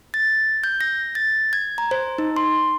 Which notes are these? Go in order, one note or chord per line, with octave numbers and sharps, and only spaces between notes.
A6
G6
A#6
A6
G#6
A#5
C5
D#4
C6